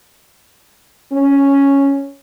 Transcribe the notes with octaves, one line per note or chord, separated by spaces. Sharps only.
C#4